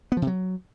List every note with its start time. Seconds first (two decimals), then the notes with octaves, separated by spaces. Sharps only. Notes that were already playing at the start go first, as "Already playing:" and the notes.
0.12 B3
0.17 F3
0.22 C3
0.27 F#3